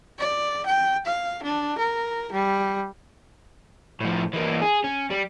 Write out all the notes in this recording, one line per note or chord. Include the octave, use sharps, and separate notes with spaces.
D5
G5
F5
D4
A#4
G3
A2 F3
E3 A#3
G#4
C#4
G3